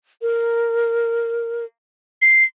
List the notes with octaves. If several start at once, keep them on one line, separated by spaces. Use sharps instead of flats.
A#4
C7